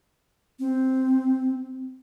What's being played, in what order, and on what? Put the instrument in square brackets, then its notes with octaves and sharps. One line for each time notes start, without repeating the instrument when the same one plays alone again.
[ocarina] C4